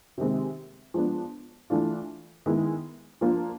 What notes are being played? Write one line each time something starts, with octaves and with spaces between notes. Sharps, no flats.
C3 D#3 G#3 C4
F3 G#3 B3 D4
E3 A3 D4 F4
D#3 G#3 B3 E4
F3 A#3 D4 F4